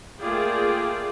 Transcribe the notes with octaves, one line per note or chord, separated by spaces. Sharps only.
A3 A#3 F4 G#4 D5 G5